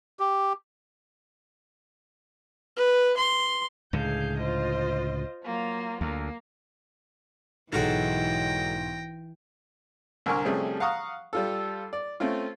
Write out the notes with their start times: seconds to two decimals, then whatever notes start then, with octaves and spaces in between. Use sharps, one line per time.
0.19 G4
2.76 B4
3.17 C6
3.93 C#2 A2 D3 G#4 F5 G6
4.38 F4 C5 D#5
5.43 F#3 A#3 F4
6.01 D2 A#3
7.72 B1 G#2 E3 G#3 F#4 A4 G5 A#6
10.26 C2 D3 A#4 G#5 C#6 F6
10.45 C3 F3 G3 A3 C#4 G#4
10.80 F5 F#5 A#5 C#6 D#6
11.33 G3 F4 A4
11.93 D5
12.20 A3 C4 C#4 F4